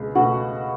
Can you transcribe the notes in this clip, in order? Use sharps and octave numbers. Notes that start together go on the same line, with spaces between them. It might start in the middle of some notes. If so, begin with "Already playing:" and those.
Already playing: C#2 B2
B2 A3 F#4 F#5